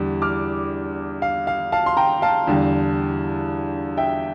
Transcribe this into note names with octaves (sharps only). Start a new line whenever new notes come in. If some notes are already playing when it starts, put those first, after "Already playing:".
Already playing: E2 D3 G3
D6 F6
F5
F5
F5 A5
C6
G5 A#5
F5 A5
E2 D3 G3
E5 G5